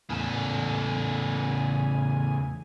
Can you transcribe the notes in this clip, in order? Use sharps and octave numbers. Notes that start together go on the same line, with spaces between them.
E2 A2 C#3 A4 G#5